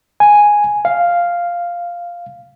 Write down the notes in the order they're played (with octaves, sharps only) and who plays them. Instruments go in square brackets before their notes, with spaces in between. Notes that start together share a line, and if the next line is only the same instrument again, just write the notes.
[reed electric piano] G#5
F5